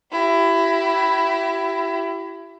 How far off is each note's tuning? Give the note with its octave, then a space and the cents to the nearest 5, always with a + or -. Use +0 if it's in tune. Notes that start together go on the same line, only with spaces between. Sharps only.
E4 +20 G4 -35